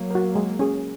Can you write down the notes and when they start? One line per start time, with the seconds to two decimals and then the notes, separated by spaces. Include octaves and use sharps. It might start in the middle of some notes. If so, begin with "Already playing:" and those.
Already playing: F#3 A#3
0.10 F#4 A#4
0.35 G#3
0.59 C#4 G#4